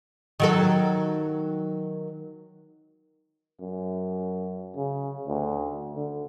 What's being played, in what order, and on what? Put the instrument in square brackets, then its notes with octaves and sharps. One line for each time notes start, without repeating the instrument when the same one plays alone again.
[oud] D#3 F#3 A4
[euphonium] F#2
C#3
D2
D3